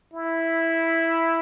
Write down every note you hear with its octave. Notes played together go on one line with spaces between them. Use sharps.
E4